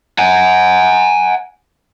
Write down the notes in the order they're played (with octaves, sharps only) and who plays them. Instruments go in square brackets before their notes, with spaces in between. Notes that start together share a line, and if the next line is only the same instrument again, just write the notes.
[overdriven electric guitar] F#5 G#5